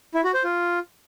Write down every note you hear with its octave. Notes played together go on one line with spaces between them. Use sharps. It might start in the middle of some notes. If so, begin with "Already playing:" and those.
E4
F#4
C5
F4